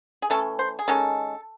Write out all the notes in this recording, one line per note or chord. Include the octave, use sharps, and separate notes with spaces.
G#4
E3 A3 C#4 A4
C5
G#4
D#3 G#3 C#4 A4